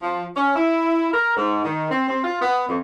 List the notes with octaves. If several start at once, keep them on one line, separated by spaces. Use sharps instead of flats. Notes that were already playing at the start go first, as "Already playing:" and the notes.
F3
C#4
E4
A#4
G#2
D#3
C4
C4
F4
B3
F2